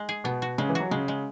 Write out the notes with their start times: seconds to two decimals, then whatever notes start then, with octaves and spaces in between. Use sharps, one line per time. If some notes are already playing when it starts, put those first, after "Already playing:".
Already playing: G#3
0.09 G#4
0.24 B2 B3
0.42 F#4
0.58 C#3 G#3
0.69 E3
0.75 F#3 F#4
0.91 C#3 G#3
1.08 G#3